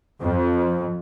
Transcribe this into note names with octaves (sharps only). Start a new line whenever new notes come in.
F2